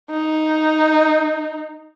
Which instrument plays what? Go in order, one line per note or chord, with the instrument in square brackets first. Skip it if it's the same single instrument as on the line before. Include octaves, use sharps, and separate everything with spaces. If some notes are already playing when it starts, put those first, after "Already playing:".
[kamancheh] D#4